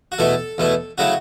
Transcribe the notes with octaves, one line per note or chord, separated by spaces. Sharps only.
F#4
E2 B2 A3 E4 A4
E2 B2 A3 E4
C#3 F#3 A3 E4 F#4